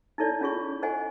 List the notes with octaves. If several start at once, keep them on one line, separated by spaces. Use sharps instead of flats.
D#4 E4 A4 C#5 D5
C#4 E4 F4 G#4 C#5 C#6
A4 C5 D#5 F#5 G#5